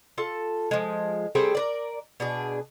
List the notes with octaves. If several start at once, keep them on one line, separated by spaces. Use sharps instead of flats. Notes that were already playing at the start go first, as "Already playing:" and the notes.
F4 A4 A5
F3 G#3
G3 A3 C4 G#4
A#4 B4 D5
B2 D4 G#4